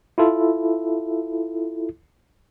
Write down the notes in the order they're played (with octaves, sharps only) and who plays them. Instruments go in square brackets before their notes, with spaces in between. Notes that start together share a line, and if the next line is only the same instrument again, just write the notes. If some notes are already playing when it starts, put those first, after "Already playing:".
[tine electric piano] E4 F4 A4